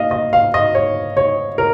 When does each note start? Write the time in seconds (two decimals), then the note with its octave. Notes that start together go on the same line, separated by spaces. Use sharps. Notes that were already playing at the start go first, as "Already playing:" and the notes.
Already playing: A#2 D#5 F5
0.11 D#5
0.33 F5
0.54 D#5
0.75 C#5
1.17 C#5
1.58 A#4